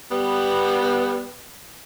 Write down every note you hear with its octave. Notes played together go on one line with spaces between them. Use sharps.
G3 B3